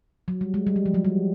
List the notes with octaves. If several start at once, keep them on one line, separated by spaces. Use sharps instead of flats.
F#3
G3
G#3
G3
F#3
F3
F#3
G3